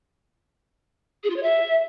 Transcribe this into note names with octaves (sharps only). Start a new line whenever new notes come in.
G#4
F4
C#5
E5